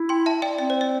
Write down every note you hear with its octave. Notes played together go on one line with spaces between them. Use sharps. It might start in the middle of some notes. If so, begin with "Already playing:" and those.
Already playing: E4
G5 C6
E5 A5
D5 G5
C4 D5
C5
D5